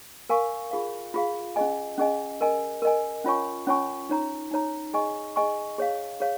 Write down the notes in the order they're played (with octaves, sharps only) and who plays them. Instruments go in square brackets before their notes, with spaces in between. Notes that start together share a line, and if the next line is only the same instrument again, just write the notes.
[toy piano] A#4 F5 G#5 C#6
F4 G#4 F5
F4 G#4 F5
C#4 G#4 D#5 G#5
C#4 G#4 D#5 G#5
A#4 D#5 G#5
A#4 D#5 G#5
C#4 F4 C#5 G#5 C#6
C#4 F4 C#5 G#5 C#6
D#4 C#5 A#5
D#4 C#5 A#5
G#4 D#5 G#5 C#6
G#4 D#5 G#5 C#6
G#4 C#5 F5
G#4 C#5 F5